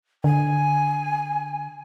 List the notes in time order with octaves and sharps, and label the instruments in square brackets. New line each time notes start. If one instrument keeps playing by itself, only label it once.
[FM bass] D3 [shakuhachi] G#5